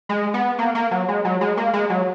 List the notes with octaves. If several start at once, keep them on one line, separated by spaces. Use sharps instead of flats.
G#3
B3
A#3
A#3
F#3
G#3
F#3
G#3
A#3
G#3
F#3